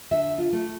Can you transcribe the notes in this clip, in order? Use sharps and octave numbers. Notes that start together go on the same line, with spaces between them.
D3 E5
F4
A3